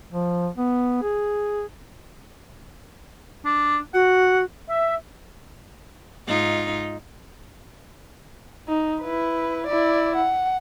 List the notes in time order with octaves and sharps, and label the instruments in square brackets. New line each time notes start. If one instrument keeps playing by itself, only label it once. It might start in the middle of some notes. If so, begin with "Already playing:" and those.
[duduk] F3
B3
G#4
[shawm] D4
[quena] F#4 [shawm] F#5
[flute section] E5
[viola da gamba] G#2 D#4 F4
[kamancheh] D#4
E4 B4
E4 D5
F#5